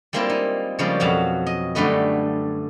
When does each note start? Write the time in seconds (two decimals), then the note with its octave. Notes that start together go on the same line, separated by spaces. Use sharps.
0.13 G3 G#3 A#3 C4 E4 F4
0.30 D#4
0.79 C#3 F3 G3 G#3 A#3
1.00 F2 B2 F#3 F5
1.46 D#5
1.75 F#2 D3 G3 A3 B4 D#5